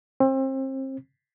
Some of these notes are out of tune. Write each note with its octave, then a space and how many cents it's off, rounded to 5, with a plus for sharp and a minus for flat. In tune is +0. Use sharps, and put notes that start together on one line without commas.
C4 +30